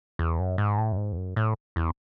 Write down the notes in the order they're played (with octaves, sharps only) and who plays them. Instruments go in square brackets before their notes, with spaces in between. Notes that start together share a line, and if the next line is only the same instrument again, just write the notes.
[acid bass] E2
F#2
G#2
A2
F#2
G#2
E2
F#2
A2
E2